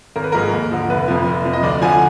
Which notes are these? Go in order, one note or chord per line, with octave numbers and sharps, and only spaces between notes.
G#1 A#4
B4
G#2 F3 A#4
D#2
D3 F3
F1 B4
F2 F3
F1
F2 F3
D#5
D2 D5
D3 F3 G#5